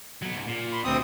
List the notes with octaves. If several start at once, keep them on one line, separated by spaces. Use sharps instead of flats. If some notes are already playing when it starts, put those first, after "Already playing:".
F#3 B3
C#2 G#2
A#2
B5 C6
D2 B2 G3 C4 D#6